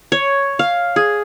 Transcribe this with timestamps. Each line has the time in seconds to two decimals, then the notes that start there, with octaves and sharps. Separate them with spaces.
0.12 C#5
0.59 F5
0.96 G#4